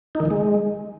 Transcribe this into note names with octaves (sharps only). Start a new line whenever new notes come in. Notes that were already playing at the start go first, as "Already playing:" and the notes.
D#4
D#3
E3
G#3